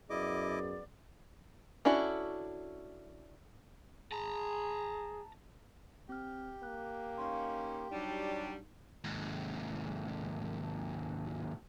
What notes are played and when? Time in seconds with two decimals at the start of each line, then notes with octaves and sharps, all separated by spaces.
0.10 F#2 B3 E4 G#4 D5 D#5 D6
1.85 C#4 D4 E4 F#4 A4
4.12 G#4 A5 A#5
6.09 C4 G4 F6
6.63 A#3 F#6
7.18 C#4 D#4 F5 C6
7.92 F#3 G3 D4 D#4
9.04 D#2 G#2